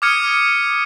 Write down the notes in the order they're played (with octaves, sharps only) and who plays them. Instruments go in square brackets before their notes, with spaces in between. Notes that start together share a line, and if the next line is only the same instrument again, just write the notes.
[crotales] D6 D#6 F6 G#6 C#7 D#7